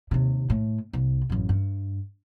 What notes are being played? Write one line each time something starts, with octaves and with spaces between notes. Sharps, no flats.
D#2 C3
A2
C2
A1 F#2
G2